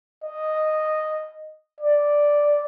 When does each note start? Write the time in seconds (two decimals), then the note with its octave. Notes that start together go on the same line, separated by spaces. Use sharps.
0.24 D#5
1.81 D5